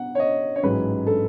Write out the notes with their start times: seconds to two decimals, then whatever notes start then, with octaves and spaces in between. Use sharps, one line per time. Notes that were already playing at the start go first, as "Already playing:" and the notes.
Already playing: B2 B3 F#5
0.15 C#5
0.19 D#5
0.56 C#5
0.63 A1 G#2 F#3 B4
1.07 A4